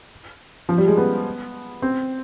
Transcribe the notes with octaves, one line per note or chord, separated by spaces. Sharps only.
F3
G3
G#3
B3
C4